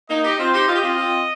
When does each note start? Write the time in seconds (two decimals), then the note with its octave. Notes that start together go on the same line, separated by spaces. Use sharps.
0.10 A#3 D#4 D#5
0.24 D#4 G4
0.39 C4 F4 C5
0.53 D#4 G4
0.68 F4 D#5
0.75 G4
0.83 C4 F4
0.97 C4 F4